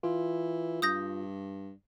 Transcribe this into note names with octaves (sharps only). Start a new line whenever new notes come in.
E3 F4
G2 D#6 G6 A#6